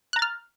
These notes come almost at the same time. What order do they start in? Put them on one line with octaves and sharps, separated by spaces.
F#6 A#5 A6 F6